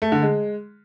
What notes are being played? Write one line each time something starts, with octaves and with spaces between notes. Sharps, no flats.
A3
D3
G#3